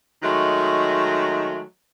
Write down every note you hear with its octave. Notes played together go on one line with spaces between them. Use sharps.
D#3 F#3 G#3 A3